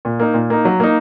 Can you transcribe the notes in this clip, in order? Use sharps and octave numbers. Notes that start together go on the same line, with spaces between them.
A#2
A#3 D#4
A#2
A#3 D#4
F#3
A#3 D#4